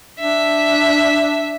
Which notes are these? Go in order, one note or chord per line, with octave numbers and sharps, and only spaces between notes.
D4 E5